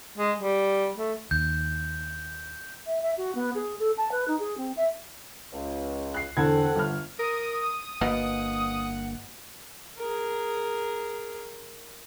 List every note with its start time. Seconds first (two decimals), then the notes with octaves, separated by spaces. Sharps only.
0.18 G#3
0.38 G3
0.97 A3
1.31 D#2 G6
2.86 E5
3.02 E5
3.18 F#4
3.35 B3
3.55 G#4
3.79 A4
3.98 A5
4.12 B4
4.28 D#4
4.39 G#4
4.58 C4
4.77 E5
5.53 C#2
6.14 F#6 C7
6.37 E2 D3 C4 A4 F#5 G#6
6.76 G1 F6
7.19 A#4 D#6
8.01 G1 B2 A#3 F#5
9.98 G#4 A#4